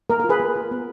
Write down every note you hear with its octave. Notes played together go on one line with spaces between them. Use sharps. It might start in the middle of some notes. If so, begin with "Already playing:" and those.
A#3 A#4
A#4
F4
G#4 B4
A#3
F4
B3